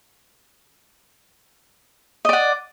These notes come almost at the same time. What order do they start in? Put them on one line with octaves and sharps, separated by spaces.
D#5 D5 F#5